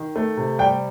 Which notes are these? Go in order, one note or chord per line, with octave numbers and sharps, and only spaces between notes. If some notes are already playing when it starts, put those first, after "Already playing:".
Already playing: D#3
A3
C3
G3 G5